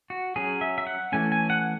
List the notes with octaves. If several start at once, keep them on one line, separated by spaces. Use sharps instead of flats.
F#4
F#3 C#4 G#4
E5
E5
F#5
E3 A3 C#4 G#5
G#5
F#5